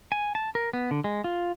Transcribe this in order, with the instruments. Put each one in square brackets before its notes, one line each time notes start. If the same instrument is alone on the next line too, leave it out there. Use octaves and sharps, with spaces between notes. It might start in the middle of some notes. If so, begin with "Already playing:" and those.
[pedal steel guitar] G#5
A5
A#4
B3
D3
G#3
F4